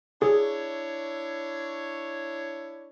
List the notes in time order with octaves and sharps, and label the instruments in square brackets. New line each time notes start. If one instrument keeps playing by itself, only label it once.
[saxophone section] D4 E4 C#5 [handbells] G#4